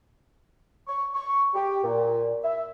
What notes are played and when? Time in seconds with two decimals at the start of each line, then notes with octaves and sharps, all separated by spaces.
0.88 C#6
1.14 C#6
1.55 G4
1.83 A#2
2.44 E5